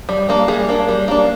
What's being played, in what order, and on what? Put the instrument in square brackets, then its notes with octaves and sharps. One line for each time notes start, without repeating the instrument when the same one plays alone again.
[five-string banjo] G3
A#3 D4
G3 G#4
A#3 D4
G3
A#3 D4